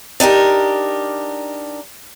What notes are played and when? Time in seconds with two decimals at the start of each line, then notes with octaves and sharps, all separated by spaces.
0.20 D4 D#4 G4 A#4